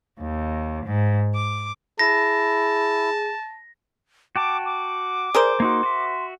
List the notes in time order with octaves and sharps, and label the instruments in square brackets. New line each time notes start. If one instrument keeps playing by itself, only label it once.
[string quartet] D#2
G#2
D6
[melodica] E4 [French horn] G#4 [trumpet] A5 [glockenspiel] A#6
[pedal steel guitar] F#4 G5 A5 [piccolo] D6
[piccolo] D6
[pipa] G#4 A#4 C5 [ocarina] D5
[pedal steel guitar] A#3 D#4 F#4 [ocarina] C6
[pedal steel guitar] F#4 E5